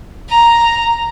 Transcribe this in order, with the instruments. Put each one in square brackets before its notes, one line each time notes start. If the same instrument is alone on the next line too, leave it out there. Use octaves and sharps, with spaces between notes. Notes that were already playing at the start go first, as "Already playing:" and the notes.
[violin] A#5